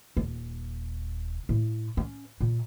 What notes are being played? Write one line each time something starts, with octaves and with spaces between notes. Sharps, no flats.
D#1
A2
C#4
A#2